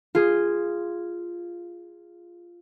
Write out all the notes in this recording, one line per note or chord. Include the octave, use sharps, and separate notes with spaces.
F4 G#4